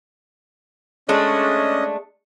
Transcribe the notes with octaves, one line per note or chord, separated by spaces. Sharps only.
G#3 A3 C#4 D4 D#5